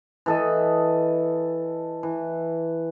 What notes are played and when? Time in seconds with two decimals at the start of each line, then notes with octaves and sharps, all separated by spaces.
0.26 E3 A4 D#5
2.03 E3